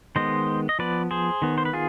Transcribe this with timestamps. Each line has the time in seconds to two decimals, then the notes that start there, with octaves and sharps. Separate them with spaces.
0.16 D#3 G#3 B3 C5 D#5
0.69 D#5
0.79 F3 B3 B4 D5
1.11 G#4 C5
1.42 D#3 B3
1.58 C5
1.65 B4
1.73 F4 G#4